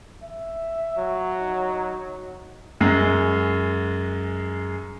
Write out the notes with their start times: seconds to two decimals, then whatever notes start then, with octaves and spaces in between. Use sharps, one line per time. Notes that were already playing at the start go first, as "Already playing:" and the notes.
0.24 E5
0.98 F#3
1.40 D#4
2.81 F#2 G#3